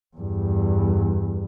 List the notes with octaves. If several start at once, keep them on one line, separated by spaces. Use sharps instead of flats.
E2 G2